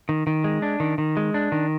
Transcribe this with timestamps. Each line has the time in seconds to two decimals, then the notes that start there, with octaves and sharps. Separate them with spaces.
0.09 D#3
0.27 D#3
0.44 G#3
0.62 D4
0.80 D#3
0.98 D#3
1.17 G#3
1.34 D4
1.52 D#3